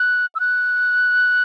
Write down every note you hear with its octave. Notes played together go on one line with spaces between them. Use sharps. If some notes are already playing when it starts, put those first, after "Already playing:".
Already playing: F#6
E6
F#6